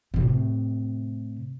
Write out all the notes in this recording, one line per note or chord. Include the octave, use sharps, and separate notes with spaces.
A2 C3